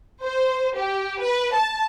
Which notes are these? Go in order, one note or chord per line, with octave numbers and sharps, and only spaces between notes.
C5
G4
B4
A5